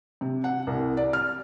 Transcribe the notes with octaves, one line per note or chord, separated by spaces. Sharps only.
C3
F#5
C2
D5
F6